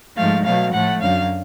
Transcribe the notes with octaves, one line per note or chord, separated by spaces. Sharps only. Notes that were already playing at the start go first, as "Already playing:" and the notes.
G#2 F3 A3 F5
B2 F#3 A3 F5
A2 F3 A3 F#5
F#2 D3 F#3 F5